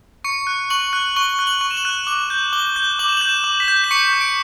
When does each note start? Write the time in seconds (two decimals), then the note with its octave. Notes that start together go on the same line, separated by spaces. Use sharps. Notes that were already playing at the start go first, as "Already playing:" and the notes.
0.24 C#6 C#7
0.47 F#6
0.70 C#6 F#7
0.93 F#6
1.16 C#6 G7
1.39 F#6
1.47 F#7
1.61 C#6
1.71 E7
1.77 F#7
1.85 F#6
2.07 D6 F#7
2.30 G6
2.53 D6 G7
2.76 G6
2.99 D6 F#7
3.08 E7
3.17 G6 F#7
3.29 E7
3.44 D6
3.60 B6
3.68 G6
3.84 B6
3.91 C#6 C#7
4.13 G6
4.21 D7